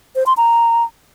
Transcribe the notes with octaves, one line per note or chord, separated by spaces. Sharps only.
C5
C6
A#5